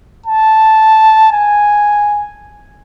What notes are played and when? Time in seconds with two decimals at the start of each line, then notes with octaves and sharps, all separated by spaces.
0.26 A5
1.32 G#5